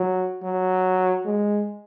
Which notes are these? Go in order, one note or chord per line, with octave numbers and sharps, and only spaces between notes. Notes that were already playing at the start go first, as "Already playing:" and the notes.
Already playing: F#3
F#3
G#3